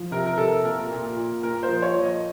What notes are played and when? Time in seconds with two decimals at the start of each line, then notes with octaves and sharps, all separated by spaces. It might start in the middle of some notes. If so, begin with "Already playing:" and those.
Already playing: F3
0.11 C3 A#4
0.26 A#4
0.38 C3 A4
0.64 A#2 A#4
0.91 A#2
1.17 A#2
1.43 A#2 A#4
1.63 C5
1.69 F3
1.82 C#5
1.95 F3
2.02 D#5